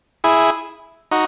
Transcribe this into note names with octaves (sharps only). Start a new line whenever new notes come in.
E4 G#4
D#4 F#4